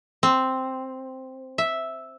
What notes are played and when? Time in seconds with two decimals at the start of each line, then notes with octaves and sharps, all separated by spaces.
0.23 C4
1.58 E5